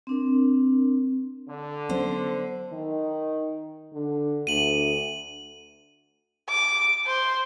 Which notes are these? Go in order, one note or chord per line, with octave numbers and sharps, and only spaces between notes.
C4 D4 A#4
D3
F#3 B3 C#4 C5
D#3
D3
D2 D#7 F#7
D6
C5